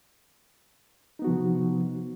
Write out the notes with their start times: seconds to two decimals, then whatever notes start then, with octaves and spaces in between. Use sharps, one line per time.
1.19 D#4
1.22 B3
1.24 F#4
1.27 F3
1.30 C3